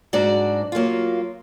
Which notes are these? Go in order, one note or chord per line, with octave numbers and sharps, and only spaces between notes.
G#2 F#3 D4 F#4 D5
F#3 A#3 F4